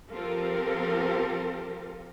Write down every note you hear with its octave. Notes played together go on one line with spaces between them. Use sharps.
F3 C4 F4 G4 A4 A#4